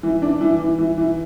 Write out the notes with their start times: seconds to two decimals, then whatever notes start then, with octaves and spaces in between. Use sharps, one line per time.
0.03 E3
0.22 D4
0.41 E3
0.60 E3
0.78 E3
0.98 E3